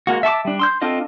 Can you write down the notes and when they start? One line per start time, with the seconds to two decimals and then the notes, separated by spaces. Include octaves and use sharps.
0.07 G#3 A#3 F#4
0.23 E5 A5 C#6 D6
0.45 G3 D4
0.59 C6 E6 G6
0.81 C4 D4 F4 A4 D#5